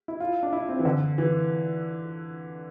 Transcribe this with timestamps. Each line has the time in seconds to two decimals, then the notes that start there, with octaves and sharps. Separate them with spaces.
0.08 E4
0.20 F4
0.43 D4
0.53 E4
0.69 C4
0.79 E3
0.85 D3
1.18 E3